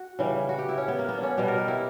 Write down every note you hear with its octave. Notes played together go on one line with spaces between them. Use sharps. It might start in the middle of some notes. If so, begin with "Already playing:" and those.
Already playing: F#4
C#3 E3 G3
F#4
G4
E4
C#4
B3
A#3
B3
D4
C#4
B2 G3 B3
A#4
G4
E4